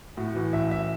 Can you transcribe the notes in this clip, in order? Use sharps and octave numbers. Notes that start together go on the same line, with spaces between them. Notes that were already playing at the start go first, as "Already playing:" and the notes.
A2 F#4
E3 F#4
A1 E5
A1 E5